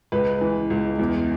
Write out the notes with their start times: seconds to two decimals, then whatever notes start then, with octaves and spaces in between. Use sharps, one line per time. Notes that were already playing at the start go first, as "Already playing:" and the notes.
0.12 C#2 B4
0.41 E3
0.70 C#2
0.99 E2